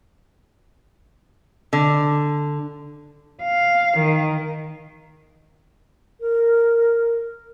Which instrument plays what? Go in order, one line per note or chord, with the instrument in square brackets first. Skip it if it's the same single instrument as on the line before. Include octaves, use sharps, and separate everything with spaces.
[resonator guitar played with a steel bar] D3
[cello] F5
D#3
[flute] A#4